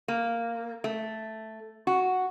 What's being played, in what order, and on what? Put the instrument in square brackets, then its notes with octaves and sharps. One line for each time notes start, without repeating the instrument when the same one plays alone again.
[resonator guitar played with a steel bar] A#3
A3
F#4